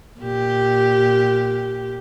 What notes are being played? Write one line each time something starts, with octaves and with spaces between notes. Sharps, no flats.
A#2 G4